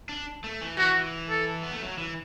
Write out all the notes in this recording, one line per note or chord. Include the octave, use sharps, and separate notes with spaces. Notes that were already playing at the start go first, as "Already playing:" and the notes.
D4
A3
E3
E3 F#4
A4
B3
A3
F#3
E3